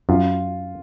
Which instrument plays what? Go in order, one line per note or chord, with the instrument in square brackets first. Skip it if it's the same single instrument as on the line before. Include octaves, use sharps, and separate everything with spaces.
[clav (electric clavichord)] F#2 [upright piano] F4